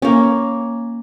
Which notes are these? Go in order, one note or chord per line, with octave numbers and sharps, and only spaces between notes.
A#3 C#4